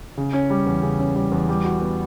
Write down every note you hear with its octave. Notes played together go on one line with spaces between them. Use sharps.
C#3
C#4
G3
E2
C#3
C#4
G3
E2
G3
F#4
B3